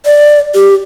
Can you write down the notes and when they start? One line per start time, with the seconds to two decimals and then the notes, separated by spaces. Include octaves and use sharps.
0.06 D5
0.54 G4